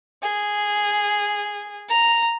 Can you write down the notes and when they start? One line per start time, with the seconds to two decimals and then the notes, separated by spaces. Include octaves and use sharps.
0.23 G#4
1.89 A#5